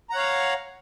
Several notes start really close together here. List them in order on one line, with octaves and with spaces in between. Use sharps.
A#5 F#5 C#5 F5